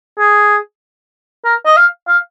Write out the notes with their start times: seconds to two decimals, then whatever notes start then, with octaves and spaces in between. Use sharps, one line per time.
0.19 G#4
1.45 A#4
1.66 D#5
1.76 F5
2.08 F5